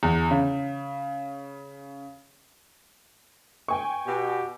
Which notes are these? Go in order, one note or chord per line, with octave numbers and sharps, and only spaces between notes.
E2
C#3
G5 G#5 C#6
B2 G4